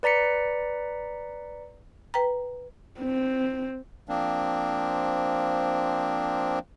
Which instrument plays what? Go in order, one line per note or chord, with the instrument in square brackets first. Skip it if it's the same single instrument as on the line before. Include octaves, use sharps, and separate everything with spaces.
[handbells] B4 D5 A#5 B6 C#7
[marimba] B4 G5 A#5
[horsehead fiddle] C4
[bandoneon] F3 A#3 C4 D4